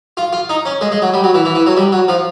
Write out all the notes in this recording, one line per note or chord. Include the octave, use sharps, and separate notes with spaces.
F4
F4
D#4
C#4
G#3
G#3
F#3
G3
F#3
E3
E3
E3
F#3
G3
F#3
F3